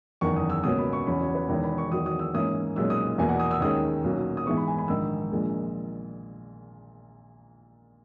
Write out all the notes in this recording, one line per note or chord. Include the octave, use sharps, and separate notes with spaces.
F#1 E2 D#3 C#6
D#6
E6
C#2 B2 A#3 C#4 D#6
B5
C#6
E2 C#3 F#3 C#4 B5
C#5
B4
E1 E2 D#3 C#5
B5
C#6
E2 D#3 F#3 D#6
D#6
E6
G#2 E3 A#3 C#4 D#6
B1 A#2 G#3 C#4 E6
D#6
E2 B2 A#3 G#5
F#5
D#6
E6
D#2 D#3 G#3 C#4 D#6
B1 A#2 F#3 A#3 C#4
D#6
G#2 E3 G#3 B3 C#6
B5
G#5
B5
A#1 G#2 D#3 E6
A#1 A#2 G#3